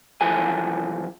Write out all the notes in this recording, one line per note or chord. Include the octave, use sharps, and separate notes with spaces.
C2 F#2 E3 F3 A4 G#5